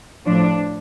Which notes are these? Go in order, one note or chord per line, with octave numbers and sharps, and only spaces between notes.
A2 F3 D4